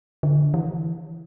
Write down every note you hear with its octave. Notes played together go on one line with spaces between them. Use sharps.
D3
E3